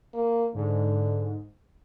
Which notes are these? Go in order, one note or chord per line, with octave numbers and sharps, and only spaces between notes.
A#3
G#2 D3